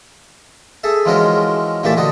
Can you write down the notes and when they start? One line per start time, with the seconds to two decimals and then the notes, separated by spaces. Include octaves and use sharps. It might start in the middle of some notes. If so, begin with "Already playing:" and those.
0.84 G#4 A4 E5
1.05 E3 F3 G#3 C#4 F#4 A#4
1.83 A#2 E3 A3 G4 E5 A5
1.97 D3 F#4 D#5 D#6